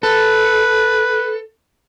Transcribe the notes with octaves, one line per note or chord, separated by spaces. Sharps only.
A4 B4